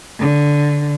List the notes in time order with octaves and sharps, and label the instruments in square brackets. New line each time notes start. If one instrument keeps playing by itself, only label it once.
[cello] D3